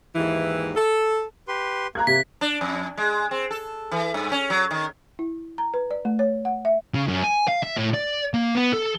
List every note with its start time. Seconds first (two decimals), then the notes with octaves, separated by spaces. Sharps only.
0.15 D#2 G#2 E3
0.76 A4
1.48 G4 B4 C6
1.95 A#3 A#5 F#6 G#6
2.07 C3 B6
2.41 D4
2.61 F2
2.97 G#3
3.31 C4
3.51 A4
3.92 E3
4.14 G2
4.32 C#4
4.50 F#3
4.71 D#3
5.19 E4
5.58 A#5
5.74 B4
5.91 D5
6.05 A3
6.19 C#5
6.45 F#5
6.65 E5
6.94 C#3
7.08 F#2
7.23 G#5
7.48 F5
7.63 E5
7.77 A2
7.94 D5
8.34 A#3
8.55 B3
8.74 A4